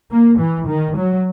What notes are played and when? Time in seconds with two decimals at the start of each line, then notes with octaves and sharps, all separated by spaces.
0.10 A#3
0.39 E3
0.67 D#3
0.96 F#3